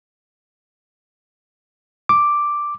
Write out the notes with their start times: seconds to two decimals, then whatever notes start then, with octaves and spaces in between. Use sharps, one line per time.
2.09 D6